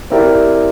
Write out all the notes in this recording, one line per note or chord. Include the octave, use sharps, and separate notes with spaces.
C4 E4 G4 A#4 D5